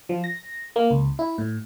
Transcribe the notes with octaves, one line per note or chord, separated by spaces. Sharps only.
F3
A#6
A#3
C#2
E4
A2